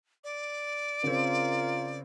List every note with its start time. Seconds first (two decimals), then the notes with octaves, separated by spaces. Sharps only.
0.24 D5
1.04 C#3 C4 F4 A#4